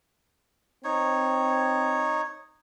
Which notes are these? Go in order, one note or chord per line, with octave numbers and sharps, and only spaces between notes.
C4 D#4 C#5